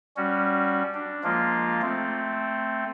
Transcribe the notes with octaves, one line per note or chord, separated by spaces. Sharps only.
G3 C#4 F#4
D4
F3 G#3 A#3 F4
A3 C4